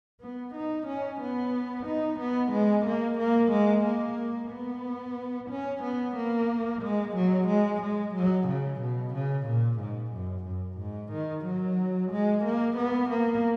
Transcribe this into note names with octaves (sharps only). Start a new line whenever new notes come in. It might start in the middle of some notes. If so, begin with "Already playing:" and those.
B3
D#4
C#4
B3
D#4
B3
G#3
A#3
A#3
G#3
A#3
B3
C#4
B3
A#3
G#3
F#3
G#3
G#3
F#3
C#3
B2
C#3
A#2
G#2
F#2
F#2
G#2
D#3
F#3
G#3
A#3
B3
A#3